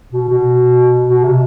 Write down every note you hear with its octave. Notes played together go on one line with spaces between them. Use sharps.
B2
B2
B2
C3